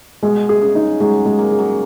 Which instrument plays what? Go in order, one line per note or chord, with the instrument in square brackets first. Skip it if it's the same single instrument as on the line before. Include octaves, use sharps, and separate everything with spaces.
[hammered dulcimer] B2 [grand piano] G#3
[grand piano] G#4
[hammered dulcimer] C#3
[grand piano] D#4
[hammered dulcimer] F#3 [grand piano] G#3
[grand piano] G#3
[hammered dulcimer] A#3
[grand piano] G#4
[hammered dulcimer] F#3